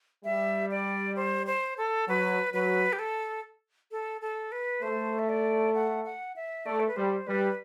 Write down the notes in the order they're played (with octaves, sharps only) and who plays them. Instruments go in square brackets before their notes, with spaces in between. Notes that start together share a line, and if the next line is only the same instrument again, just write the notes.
[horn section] G3 [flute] E5
[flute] D5
C5
C5
A4
[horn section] F#3 [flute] B4
[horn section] F#3 [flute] B4
[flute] G4
A4
A4
A4
B4
[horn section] A3 [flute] C5
[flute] E5
D5
F#5
F#5
E5
[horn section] A3 [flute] D5
[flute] A4
B4
[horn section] G3 [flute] C5
[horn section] G3 [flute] B4